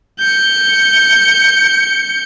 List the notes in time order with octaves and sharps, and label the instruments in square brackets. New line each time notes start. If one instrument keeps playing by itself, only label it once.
[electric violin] G6 C#7